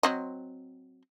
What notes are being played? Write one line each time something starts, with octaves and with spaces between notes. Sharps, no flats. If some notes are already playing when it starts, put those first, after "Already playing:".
F#3 C4 D#5